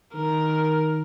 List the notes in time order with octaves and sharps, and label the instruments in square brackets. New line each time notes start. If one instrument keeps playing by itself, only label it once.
[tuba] D#3 [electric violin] A#4